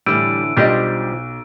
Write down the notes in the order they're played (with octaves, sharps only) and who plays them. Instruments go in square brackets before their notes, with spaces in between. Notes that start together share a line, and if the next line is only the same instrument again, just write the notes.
[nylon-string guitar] A2 D3 E3 [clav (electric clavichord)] G3 [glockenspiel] E6 D7 D#7
[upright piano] B1 [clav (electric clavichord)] G3 D4 G4 [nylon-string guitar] F4 C5 D#5